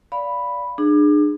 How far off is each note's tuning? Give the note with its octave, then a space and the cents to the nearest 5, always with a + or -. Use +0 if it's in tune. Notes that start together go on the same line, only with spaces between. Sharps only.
D5 -20 F5 +0 B5 +0
D4 +35 G#4 +0